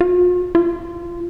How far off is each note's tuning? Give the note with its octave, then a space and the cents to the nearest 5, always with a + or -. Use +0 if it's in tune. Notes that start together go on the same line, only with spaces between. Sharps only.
F4 +45
F4 -20